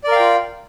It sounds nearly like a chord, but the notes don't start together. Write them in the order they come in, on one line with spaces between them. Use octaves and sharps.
D5 A#4 F5 G5 F4